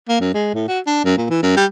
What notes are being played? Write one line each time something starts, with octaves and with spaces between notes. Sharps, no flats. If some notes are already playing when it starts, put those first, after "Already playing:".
A#3
F#2
G#3
A2
F#4
D4
F#2
A#2
E3
F#2
G3